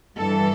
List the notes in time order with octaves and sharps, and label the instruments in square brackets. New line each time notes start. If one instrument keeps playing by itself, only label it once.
[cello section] G2 E3 G3 A4